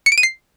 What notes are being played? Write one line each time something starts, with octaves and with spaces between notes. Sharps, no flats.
C#7
D7
D#7
C7